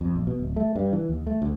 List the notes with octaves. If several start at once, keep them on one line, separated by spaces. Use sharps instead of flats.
F2
A#1
B2
D1
A3
G2
E3
D#2
A3
D2